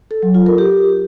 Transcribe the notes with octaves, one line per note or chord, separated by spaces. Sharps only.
A4
F#3
F4
A#4
G4